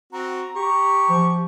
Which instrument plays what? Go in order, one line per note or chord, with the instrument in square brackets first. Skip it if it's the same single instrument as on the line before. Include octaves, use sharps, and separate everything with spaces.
[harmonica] C4 F#4 [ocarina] A#5
[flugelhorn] G4 [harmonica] C#6
[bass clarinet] F3